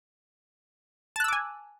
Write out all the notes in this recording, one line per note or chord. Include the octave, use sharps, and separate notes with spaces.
G#5 A5 D6 E6 F#6